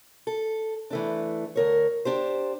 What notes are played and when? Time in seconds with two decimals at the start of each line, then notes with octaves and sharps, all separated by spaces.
0.27 A4
0.90 E3 A3 D4
1.56 D2 A#4 C#5
2.05 D4 G4 C5